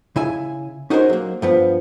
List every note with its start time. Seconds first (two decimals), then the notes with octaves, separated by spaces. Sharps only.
0.16 C#3 E4 G#5
0.90 C#4 D#4 F#4 G#4 A#4 C5
1.10 F#3 A#3
1.42 G2 F3 B3